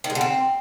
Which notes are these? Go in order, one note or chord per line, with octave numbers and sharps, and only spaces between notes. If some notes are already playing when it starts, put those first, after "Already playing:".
D#3
G#3
D3
C4